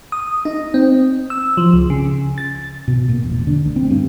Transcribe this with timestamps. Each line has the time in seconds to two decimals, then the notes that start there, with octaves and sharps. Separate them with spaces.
0.12 D#6
0.45 D#4
0.74 C4
1.30 E6
1.57 F3
1.73 C#2
1.90 C#3
2.38 A6
2.88 B2
3.09 A#2
3.23 E1
3.47 D3
3.65 D2
3.76 C4
3.90 G2